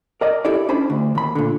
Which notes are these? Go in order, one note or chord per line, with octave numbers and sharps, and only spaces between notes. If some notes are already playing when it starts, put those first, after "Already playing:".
A#4 D5 D#5
E4 G4 A4 D5
C#4 D4 C5 B5
D2
D#2 B5
A#2 D3